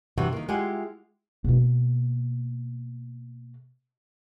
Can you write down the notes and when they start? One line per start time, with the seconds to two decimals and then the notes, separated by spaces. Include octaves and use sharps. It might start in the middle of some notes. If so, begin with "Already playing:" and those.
0.18 G2 C3 E3 F#4
0.33 D#3 A#3
0.49 G#3 E4 F4 G4 F#5 G#5
1.44 B2 A#3